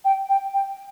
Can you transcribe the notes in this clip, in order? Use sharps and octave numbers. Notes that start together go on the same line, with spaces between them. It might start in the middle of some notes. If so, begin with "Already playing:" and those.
G5
G5
G5